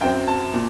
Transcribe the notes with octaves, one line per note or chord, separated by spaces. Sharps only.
F#2 F#3 C4 G5
A5
A#2